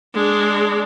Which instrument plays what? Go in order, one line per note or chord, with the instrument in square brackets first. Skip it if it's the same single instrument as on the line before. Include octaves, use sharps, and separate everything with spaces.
[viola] G#3 D4